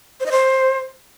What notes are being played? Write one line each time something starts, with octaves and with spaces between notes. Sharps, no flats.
C5
D#5
C5